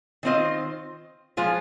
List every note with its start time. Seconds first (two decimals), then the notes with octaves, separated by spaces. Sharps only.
0.23 D#3 C4 F4 C5 D#5
1.37 F3 G#3 F4 C5